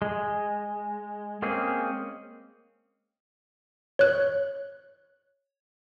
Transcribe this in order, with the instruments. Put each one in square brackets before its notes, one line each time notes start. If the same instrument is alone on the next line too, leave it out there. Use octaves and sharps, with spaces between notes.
[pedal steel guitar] G#3
G#3 A#3 C4 C#4 G#4
[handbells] C#5 F#6